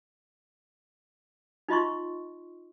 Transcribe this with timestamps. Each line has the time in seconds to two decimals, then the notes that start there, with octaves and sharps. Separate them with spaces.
1.68 D#4 F4 D#5 C6 C#6